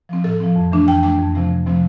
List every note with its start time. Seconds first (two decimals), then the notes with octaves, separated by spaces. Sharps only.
0.09 F3 C4
0.24 A2 A4
0.40 F3 C4
0.56 F2
0.72 E3 A3 D4
0.87 F2 G5
1.03 E3 A3 D4 G5
1.19 F2
1.35 C3 F3 A3 C4
1.50 F2
1.66 C3 F3 A3 C4